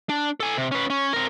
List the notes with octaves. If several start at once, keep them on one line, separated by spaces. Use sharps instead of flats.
D4
A4 G#5
C3
C#4 B4
C#4
C4 A#4